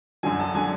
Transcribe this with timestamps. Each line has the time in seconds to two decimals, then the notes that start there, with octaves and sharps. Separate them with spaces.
0.23 F#2 D3 F#3 G#5
0.40 A5
0.55 D3 F#3 G#5